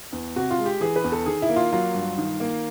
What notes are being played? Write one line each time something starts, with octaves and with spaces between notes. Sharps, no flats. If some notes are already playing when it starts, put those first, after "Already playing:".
E2
C3 F#4
F4
G#3
G4
E3 G#4
B4
E2
A4
D#3 G#4
E4
A#3
F4
F#3 F4
G2
D#3
A#3